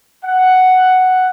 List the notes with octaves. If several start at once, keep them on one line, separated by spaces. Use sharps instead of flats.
F#5